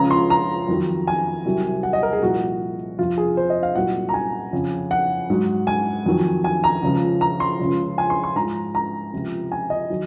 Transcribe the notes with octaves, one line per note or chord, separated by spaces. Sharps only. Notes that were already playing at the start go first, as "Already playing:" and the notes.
Already playing: C#2 C#3 F3 A#5
C6
A#5
F2 D#3 F#3
G#5
C2 C3 F#3
F#5
D#5
A#4
G#4
C2 A#2 F3 F#4
F2 C3 F3 F4
G#4
C5
D#5
F5
C2 A#2 F#3 F#5
A#5
G#5
F2 C#3 F3
F#5
G#2 F#3
G#5
F2 D#3 F#3
G#5
A#5
C#2 C#3 F3
A#5
C6
C#2 C#3 F3
G#5
C6
C6
G#2 F3 A#5
A#5
C#2 C3 F3
G#5
D#5
D#3 F#3